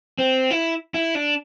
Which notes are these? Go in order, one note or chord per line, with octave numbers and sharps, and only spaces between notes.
C4
E4
E4
D4